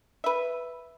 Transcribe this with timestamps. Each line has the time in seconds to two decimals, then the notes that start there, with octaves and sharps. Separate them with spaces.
0.24 B4 E5